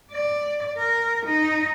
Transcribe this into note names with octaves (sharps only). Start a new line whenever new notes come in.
D5
A#4
D#4